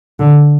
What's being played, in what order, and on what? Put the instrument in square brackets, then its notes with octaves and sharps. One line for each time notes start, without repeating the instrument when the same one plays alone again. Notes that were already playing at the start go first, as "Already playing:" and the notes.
[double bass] D3